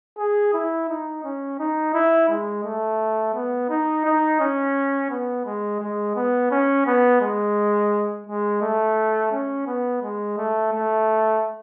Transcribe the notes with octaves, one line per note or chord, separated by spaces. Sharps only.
G#4
E4
D#4
C#4
D#4
E4
G#3
A3
B3
D#4
D#4
C#4
B3
G#3
G#3
B3
C#4
B3
G#3
G#3
A3
C#4
B3
G#3
A3
A3